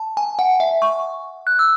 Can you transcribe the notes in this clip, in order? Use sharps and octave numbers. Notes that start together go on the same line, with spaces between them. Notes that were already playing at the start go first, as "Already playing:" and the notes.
Already playing: A5
G#5
F#5
E5
C#6
F#6
E6